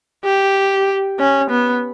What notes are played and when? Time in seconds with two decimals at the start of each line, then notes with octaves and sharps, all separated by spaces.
0.25 G4
1.20 C#4
1.50 B3